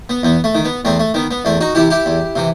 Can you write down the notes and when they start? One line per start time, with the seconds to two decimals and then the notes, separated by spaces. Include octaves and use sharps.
0.09 B3
0.23 E2 B3
0.44 A3
0.55 D#3
0.65 B3
0.85 E2 A3 C4
0.99 A3
1.14 D#3 B3
1.31 B3
1.45 E2 A3 C4
1.61 D#4 F#4
1.75 C3 E3 E4 G4
1.90 E4 G4
2.06 E2
2.36 C3 E3